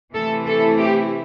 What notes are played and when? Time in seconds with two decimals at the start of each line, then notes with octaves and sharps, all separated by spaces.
0.14 C3 E3 A3 E4 A4
0.47 A4
0.79 G4